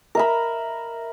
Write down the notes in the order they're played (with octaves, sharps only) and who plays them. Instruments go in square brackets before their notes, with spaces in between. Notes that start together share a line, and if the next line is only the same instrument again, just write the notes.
[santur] A#4 E5 B5